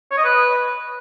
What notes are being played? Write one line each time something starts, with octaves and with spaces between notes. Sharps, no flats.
C#5
D#5
B4